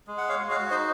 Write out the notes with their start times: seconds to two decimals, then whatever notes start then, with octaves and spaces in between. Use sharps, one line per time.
0.07 G#3
0.18 F#5
0.29 C#5 F5
0.40 F#4
0.50 C#5 F5
0.70 D#4 C5 D#5